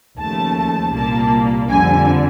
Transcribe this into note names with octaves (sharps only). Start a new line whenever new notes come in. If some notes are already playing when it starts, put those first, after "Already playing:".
D#2 C#3 F3 A3 A5
C2 A#2 G3 A#3 A5
F2 D3 G3 G#5